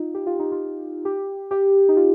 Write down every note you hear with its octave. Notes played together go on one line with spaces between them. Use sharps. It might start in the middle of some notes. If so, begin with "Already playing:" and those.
Already playing: D#4 F4
G4
F4
D#4
F4
G4
G4
D#4
F4